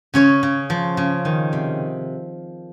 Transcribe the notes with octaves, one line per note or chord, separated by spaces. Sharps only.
C#3 C#4 C#5
C#3
F3
C#3
D#3
C3